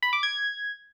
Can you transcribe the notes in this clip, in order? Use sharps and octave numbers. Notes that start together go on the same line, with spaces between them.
B5
D6
G#6